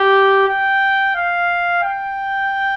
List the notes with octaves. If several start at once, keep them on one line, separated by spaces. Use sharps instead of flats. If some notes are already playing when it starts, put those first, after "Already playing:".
Already playing: G4
G5
F5
G5